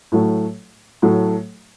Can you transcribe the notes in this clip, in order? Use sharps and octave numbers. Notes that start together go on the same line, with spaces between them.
A2 F#3 A3
A2 F#3 A3